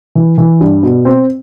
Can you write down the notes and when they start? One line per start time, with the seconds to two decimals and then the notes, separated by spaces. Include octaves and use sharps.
0.15 E3
0.38 E3
0.60 G2
0.83 B2
1.05 C4